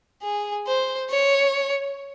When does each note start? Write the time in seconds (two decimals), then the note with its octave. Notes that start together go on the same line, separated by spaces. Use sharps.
0.23 G#4
0.67 C5
1.10 C#5